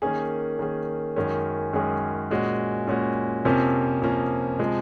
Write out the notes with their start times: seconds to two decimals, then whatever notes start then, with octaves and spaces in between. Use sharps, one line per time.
0.02 D#3 A#3 C#4 G#4
0.59 D#3 A#3 C#4 G#4
1.16 F#2 D#3 G#3 C#4 G#4
1.73 F#2 D#3 G#3 C#4 G#4
2.30 A#2 G#3 C#4 F#4
2.88 A#2 G#3 C#4 F#4
3.45 F2 C3 F3 A#3 C#4
4.02 F2 C3 F3 A#3 C#4
4.59 C3 F3 G#3